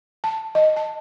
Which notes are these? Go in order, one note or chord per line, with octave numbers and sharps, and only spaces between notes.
A5
D#5
A5